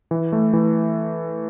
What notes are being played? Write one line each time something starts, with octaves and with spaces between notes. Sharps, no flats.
E3
A3
E3